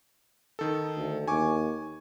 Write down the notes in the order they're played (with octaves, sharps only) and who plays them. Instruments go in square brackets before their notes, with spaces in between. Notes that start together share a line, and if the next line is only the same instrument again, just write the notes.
[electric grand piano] D#3 A4
[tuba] D2
[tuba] D#2 [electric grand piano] G#5 C#6 D6